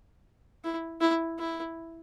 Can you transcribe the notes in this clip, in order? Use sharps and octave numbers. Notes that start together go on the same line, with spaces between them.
E4
E4
E4